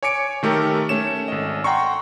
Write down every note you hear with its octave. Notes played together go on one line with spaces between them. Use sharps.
C#5 G#5 D6 C#7 D7
D#3 A3 G4 A4 A#4
A3 C#4 C#5 E7
G#1 D#5
F#5 G5 A#5 C6 C#6